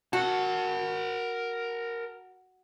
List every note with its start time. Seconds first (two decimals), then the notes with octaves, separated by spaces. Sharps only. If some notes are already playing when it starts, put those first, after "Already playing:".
0.13 F#4 A#4 A5